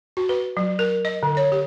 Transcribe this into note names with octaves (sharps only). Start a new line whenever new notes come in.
F#4
B4
F#3
A#4
D#5
D3
C#5
G4